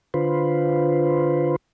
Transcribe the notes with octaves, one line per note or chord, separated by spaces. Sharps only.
D3 F4 B4 C5